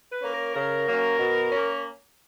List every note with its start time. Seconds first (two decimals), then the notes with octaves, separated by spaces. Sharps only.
0.10 B4
0.22 A#3 C#4
0.33 A#4
0.54 C#3 A#4
0.86 F#3 A#3 C#4
1.18 B2
1.52 A#3 C#4